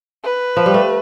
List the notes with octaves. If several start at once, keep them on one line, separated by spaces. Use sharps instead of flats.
B4
F3
G3
A3